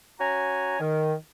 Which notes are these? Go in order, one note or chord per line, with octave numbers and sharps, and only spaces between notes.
C#4 F#4 G#5 A#5
D#3